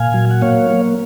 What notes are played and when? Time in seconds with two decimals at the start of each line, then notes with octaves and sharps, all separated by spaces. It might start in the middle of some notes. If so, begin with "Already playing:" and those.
Already playing: A#2 F5 G#5
0.14 F#3
0.31 F#5
0.42 A#3 C#5 F5
0.71 A#3